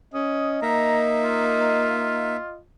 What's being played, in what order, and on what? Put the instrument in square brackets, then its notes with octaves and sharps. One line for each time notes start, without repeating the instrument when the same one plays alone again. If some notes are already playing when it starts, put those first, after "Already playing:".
[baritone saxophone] C#4 [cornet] D#5 [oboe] D#6
[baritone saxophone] A#3 [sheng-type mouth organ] D#4 E5 [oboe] A#5
[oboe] F4